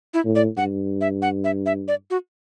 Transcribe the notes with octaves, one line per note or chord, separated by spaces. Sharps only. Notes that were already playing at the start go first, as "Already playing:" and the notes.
E4
A2
D5
G2 F#5
E5
F#5
E5
E5
D5
F#4